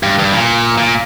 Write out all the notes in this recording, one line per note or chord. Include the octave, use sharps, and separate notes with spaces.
G2
G2
A#2
A#2